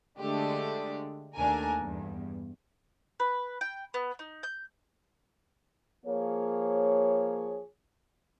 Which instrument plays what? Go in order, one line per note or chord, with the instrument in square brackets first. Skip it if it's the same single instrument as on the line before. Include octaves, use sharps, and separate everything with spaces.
[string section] D3 G#3 A3 D4 G4
D#2 A3 D4 A#4 G#5
E2 G2
[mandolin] B4
G5
B3
D#4
G6
[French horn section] F3 A#3 G#4 C#5